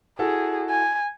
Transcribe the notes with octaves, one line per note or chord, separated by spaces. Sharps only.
E4 F#4 G#4 A4
G#5